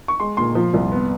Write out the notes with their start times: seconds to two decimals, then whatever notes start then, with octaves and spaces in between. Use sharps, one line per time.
0.08 C#6
0.20 G#3 C6
0.37 A#2 C6
0.55 F3
0.74 C2
0.92 B3